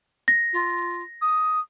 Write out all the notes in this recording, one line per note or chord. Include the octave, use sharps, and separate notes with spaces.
A#6
F4
D#6